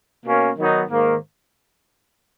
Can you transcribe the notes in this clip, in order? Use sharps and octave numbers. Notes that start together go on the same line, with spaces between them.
B2 A#3 C#4
D#3 F#3 B3 D#4
G#2 D#3 A#3